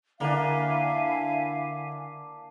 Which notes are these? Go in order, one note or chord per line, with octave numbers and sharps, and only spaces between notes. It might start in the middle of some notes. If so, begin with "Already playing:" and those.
D3 A#3 D4 E4 E5 F5 G#5